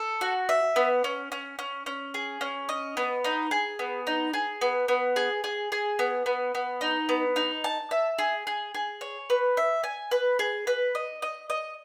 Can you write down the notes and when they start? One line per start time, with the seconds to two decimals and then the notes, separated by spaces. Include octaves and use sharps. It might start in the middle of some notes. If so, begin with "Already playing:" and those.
Already playing: A4
0.21 F#4
0.49 E5
0.76 B3
1.04 C#4
1.32 C#4
1.59 C#4
1.86 C#4
2.14 G#4
2.41 C#4
2.69 D#5
2.97 B3
3.24 D#4
3.51 G#4
3.79 B3
4.07 D#4
4.33 G#4
4.61 B3
4.88 B3
5.16 G#4
5.44 G#4
5.72 G#4
5.99 B3
6.26 B3
6.55 B3
6.81 D#4
7.09 B3
7.36 D#4
7.64 A5
7.91 E5
8.18 G#4
8.47 G#4
8.74 G#4
9.01 C#5
9.30 B4
9.57 E5
9.84 G#5
10.11 B4
10.39 G#4
10.67 B4
10.95 D#5
11.22 D#5
11.50 D#5